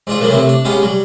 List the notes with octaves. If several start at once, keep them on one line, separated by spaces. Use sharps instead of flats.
G#2 D4 F4
A#2 D3 F3 F#3 A#3 B3
A2 C3 C4
D4
G#3 B3 C#4 G4 F5
F#3 G3